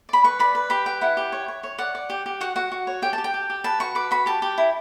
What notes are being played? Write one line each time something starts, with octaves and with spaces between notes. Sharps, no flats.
D5 B5
B4 C#6
D5 B5
B4
G4 B5
B4 G5
E4 F#5
G4
C#5
C#5
C#5
D5 F#5
D5
G4
G4
F#4 F#5
F#4 F#5
F#4
C#5
G4 G5
G4 A5
G5
G4
G4
B4 A5
F#4 C#6
B4 D6
F#4 B5
G4 A5
G4
E4